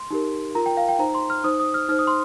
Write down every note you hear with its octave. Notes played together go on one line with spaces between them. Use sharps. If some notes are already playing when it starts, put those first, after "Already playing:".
Already playing: C6
D#4 G4 A#4
F4 A#4 A#5
G5
F5
G5
D#4 C5 A#5
C6
F6
D#4 C5 D#6
D#6
F6
D#4 C5 F6
D#6
C6